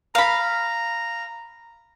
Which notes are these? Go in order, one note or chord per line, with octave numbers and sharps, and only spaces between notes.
F5 A#5 B5